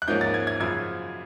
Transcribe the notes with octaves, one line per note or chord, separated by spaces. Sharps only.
F#6
G#2 F3 A#3 C#4 G6
A6
G#6
G#6
F#2 C#3 F3 G#6